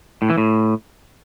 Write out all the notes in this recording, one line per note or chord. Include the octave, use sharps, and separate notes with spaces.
A2
E3
A2